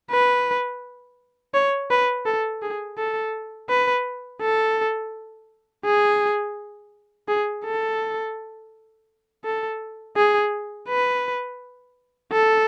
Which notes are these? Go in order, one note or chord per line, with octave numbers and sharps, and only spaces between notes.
B4
C#5
B4
A4
G#4
A4
B4
A4
G#4
G#4
A4
A4
G#4
B4
A4